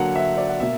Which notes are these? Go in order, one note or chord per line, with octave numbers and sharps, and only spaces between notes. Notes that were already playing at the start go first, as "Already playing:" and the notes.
Already playing: D3 F#3 A#3 F#5
E5
D5
F#5
B2 A#3 E5